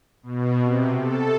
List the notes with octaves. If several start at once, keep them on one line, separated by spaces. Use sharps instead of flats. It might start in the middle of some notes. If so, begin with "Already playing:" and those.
B2
C3
A4